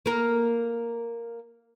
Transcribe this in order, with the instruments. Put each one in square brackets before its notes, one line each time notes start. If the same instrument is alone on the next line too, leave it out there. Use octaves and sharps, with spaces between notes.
[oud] A#3 A#4